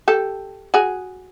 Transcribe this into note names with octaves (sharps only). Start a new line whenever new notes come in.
G4 A4
F#4 G#4